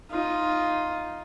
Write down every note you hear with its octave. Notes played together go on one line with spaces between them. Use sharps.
D#4 F4